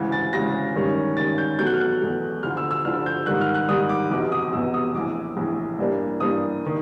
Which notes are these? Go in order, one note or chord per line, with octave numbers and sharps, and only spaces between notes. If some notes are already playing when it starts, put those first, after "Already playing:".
Already playing: D2 C#3 E3 G#3
A6
D2 C#3 E3 G#3 A#6
G2 D#3 G#3 C#4
G2 D#3 G#3 C#4 A6
G6
E2 B2 F#3 A3 G6
F#6
F6
F#6
E2 B2 F#3 A3
D2 D3 F3 F6
E6
E6
D2 D3 F3 F6
G6
G#2 D#3 G3 F#6
F6
F#6
G#2 D#3 G3 D#6
D6
F1 E2 B2 D6
D#6
F1 E2 B2 E6
D#6
A#1 A2 E3 D6
A#1 A2 E3
G2 E3 G3 A#3 D4
G2 E3 G3 A#3 D4 D#6
D#3